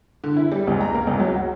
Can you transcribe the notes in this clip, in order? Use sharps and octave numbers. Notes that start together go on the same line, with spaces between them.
D3
E4
G3
C#2
A#5
A#3
C#2
F#3
F#4